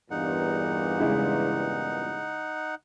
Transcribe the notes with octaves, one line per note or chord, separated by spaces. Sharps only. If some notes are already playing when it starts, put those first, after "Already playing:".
E2 G2 A#2 D#4 F#5
C#3 G#3 E4